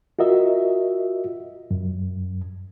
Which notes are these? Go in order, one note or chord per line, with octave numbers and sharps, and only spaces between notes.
F4 F#4 A#4 D#5 E5
F#2